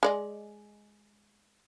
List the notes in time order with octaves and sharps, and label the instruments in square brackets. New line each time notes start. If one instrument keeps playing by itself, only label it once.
[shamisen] G#3 D5 D#5